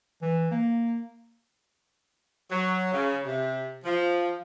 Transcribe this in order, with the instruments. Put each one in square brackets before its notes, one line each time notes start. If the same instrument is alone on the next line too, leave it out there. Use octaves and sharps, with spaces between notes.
[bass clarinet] E3
A#3
[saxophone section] F#3
C#3
C3
F3